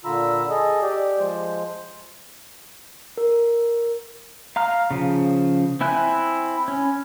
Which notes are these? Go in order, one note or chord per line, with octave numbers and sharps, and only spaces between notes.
A#2 D3 F4 A#5 B5 E6
G#4 A4 D#5
G4 D5
F3 G#3 C5
A#4
F5 A#5 F6
C#3 F3
C4 E4 E5 G#5 F#6
C#4